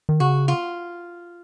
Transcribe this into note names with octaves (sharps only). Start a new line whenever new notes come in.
D#3
C#3 F#4
F4